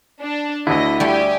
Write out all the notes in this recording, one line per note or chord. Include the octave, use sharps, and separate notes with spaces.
D4
D2 D3 E4 D#5
G3 A3 G4 G#5